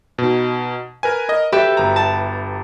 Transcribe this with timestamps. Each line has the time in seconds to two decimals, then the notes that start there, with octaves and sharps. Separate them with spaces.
0.18 B2 D#4
1.03 A#4 B4 G#5
1.29 A#4 D#5
1.52 G4 A4 B4 E5
1.77 G1 A#5
1.96 A5